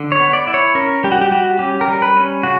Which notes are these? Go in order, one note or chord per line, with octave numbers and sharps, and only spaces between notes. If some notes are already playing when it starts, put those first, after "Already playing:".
Already playing: D3
C#5
B3
D5
E4
C#5
C#4 A#4
G3 G4
F#4
G4
G3 F#4
C#4 G4
A#4
G3
B4
C#4
C#3 F#4